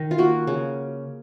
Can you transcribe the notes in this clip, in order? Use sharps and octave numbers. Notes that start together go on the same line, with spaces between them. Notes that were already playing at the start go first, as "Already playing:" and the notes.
Already playing: D#3
F4
A#3 F#4
C#3